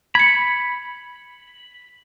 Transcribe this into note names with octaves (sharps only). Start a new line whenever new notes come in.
B5 G#6 C#7